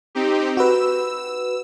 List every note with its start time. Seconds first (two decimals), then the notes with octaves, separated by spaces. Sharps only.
0.15 C4 D#4 G4
0.57 F#4 B4 E6